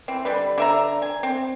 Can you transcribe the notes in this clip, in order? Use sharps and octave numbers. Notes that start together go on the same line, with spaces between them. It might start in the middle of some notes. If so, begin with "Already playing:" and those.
E3 C4
D3 G3 B4
D3 E5 A#5
G#5
C4